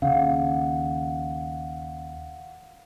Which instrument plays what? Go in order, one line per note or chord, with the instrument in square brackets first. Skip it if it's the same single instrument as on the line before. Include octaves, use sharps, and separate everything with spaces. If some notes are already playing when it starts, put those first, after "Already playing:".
[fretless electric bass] D#2 C#3 [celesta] F5 F#5